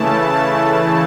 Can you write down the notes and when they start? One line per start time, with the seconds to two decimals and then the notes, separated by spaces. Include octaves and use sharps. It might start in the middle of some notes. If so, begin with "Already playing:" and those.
Already playing: C#3 E3 A3 E4 A5
0.32 A5